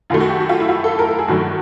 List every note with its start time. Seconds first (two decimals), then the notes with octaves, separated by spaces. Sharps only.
0.10 F#2 D#3 F#3 A3 F4
0.20 F#4
0.29 G4
0.40 F#4
0.49 F4
0.60 E4
0.69 F4
0.84 A4
0.99 A#4
1.08 A4
1.19 G#4
1.28 G2 D#3 F#3 A3 F#4